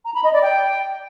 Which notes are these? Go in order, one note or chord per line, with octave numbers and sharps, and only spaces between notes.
A#5
B5
D#5
D5
G5